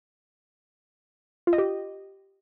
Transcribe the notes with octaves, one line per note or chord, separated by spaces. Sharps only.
F4
D#5
G4